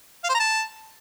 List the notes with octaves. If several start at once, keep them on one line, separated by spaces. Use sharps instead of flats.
F5
C5
A#5
A5